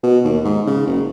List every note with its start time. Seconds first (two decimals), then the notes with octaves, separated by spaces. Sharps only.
0.03 B2
0.24 D#2
0.45 G#2
0.67 C#3
0.87 F#1